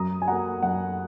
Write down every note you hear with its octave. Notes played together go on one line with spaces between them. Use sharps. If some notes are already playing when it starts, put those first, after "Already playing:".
Already playing: F#2 A#5 D#6
G#5
F#3 A#3 F#5 A#5
F#2 F#5